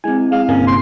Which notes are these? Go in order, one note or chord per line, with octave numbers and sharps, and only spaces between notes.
G#3 C4 E4 G#5
G#3 F5
G1 C3 A#3 C#4
C6